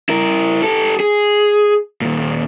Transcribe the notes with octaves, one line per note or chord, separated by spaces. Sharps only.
E4 A#4
G4 A4
G#4
D#2 A#2